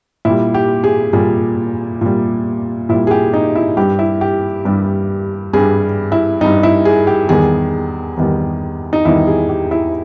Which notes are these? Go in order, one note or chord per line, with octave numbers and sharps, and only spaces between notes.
A#2 G3 E4
G4
G#4
A#2 G3 G#4
A#2 G3
A#2 G3 E4
G#4
G4
D#4
E4
G2 G3 G4
E4
G4
G2 G3
G2 G3 G#4
E4
G2 G3 D#4
E4
G#4
G4
E2 D#3 G3 G#4
E2 D#3 G3
D#4
E2 D#3 G3 E4
G#4
G4
E4